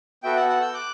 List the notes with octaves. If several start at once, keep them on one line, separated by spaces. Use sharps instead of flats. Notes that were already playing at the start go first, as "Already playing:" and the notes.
B3 F#4 A4 E5 G5
F#5 A5
F#5 A5
E6 G6
D6 F#6